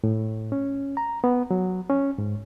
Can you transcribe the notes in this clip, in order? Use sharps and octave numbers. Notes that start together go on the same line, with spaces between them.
A2
C#4
A#5
B3
F#3
C#4
G#2